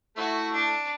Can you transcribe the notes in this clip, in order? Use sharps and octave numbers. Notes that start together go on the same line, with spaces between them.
A3 E4 F#4
D4